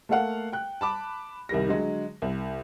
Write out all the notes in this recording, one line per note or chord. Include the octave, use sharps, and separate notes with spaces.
A3 A#3 A4 F5 F#5
G5 F#6
A5 B5 D6
C2 D#3 G3 A#6
D3 F#3 G#3
C2